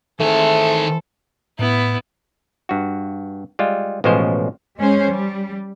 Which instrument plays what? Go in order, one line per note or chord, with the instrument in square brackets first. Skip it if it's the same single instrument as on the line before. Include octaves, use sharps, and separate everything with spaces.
[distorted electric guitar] D#3 G#4 [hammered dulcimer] E3 C4 [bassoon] A3 [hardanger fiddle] A4
[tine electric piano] A2 [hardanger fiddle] B3 E4
[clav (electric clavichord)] G2 F#4
G3 G#3 F4
A1 B2 F3 G#3 C#4 C5
[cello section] G#3 C#4 C5
G3